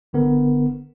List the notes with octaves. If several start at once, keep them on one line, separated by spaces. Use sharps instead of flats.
G1 D3 B3 A#4